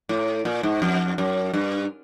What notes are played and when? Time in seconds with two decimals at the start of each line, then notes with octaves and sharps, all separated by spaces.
0.09 A2
0.45 A#2
0.63 G#2
0.82 F2
1.18 F#2
1.53 G2